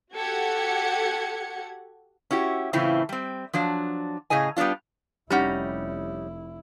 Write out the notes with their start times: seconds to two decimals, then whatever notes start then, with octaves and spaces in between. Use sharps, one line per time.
0.15 F#4 G4 A4 F#5 G#6 C#7
2.31 C#4 E4 F#4 G4
2.73 A2 C#3 E3 C4 E4 F4
3.09 G3 C4
3.53 F3 F#3 D4
4.30 A2 C#3 G#4 D#5 G#5
4.57 G3 B3 C4 D4 F4
5.30 F1 G3 C#4 D#4 E4 G4 F#5